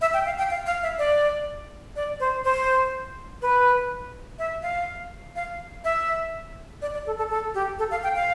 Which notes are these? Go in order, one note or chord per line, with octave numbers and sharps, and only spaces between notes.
E5
G5
F5
G5
F5
F5
E5
D5
D5
C5
C5
B4
E5
F5
F5
E5
D5
D5
A4
A4
A4
G4
A4
F5
G5
F5